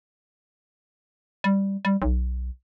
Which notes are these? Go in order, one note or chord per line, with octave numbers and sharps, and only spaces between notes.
G3
G3
B1